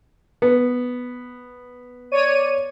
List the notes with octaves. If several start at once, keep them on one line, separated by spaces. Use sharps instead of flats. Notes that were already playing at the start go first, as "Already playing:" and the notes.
B3
C#5 D5 D#7